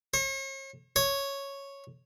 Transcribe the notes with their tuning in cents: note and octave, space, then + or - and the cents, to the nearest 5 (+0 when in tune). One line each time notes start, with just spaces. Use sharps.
C#5 -45
C#5 -5